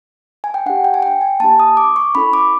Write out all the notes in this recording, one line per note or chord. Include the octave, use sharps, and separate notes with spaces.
G#5
G5
D4 G4 F#5
G5
G#5
G5
G#5
A#3 D4 G4 A5
D#6
D6
C#6
C#4 E4 A4 B5
D6